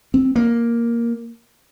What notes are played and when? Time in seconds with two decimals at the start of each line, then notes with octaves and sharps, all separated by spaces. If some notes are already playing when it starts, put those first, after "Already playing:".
0.14 C4
0.36 A#3